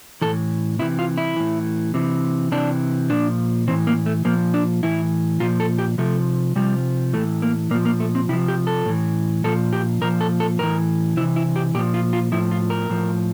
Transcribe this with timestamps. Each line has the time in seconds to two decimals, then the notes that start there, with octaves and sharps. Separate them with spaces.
0.21 A2 E3 A4
0.79 C3 E3 E4
0.99 F4
1.18 E4
1.36 A2 E3
1.94 C3 E3
2.52 C3 E3 D4
3.10 A#2 F3 D4
3.68 E3 C4
3.71 A2
3.87 A#3
4.06 A3
4.25 A#2 F3 A#3
4.54 D4
4.83 A2 E3 E4
5.40 A#2 F3 F4
5.60 A4
5.78 G4
5.98 C3 F3 A3
6.56 C3 F3 G3
7.13 A2 E3 A3
7.42 A#3
7.71 A#2 A#3
7.74 F3
7.85 A#3
8.00 A3
8.15 C4
8.29 C3 E4
8.33 F3
8.48 G4
8.67 A4
8.86 A2 E3
9.44 A#2 F3 A4
9.73 G4
10.01 A#2 F3 A#4
10.21 A4
10.40 A4
10.59 A2 E3 A#4
11.17 C3 E4
11.21 E3
11.36 E4
11.56 G4
11.74 A#2 G4
11.78 F3
11.94 F4
12.13 F4
12.32 A2 F3 E4
12.51 F4
12.70 A#4
12.90 A2 F3